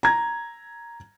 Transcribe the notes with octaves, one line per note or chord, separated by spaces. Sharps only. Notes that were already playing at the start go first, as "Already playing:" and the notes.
A#5 G#6